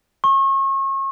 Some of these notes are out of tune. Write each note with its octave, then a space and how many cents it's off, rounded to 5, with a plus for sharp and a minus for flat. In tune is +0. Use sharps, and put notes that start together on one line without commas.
C#6 -35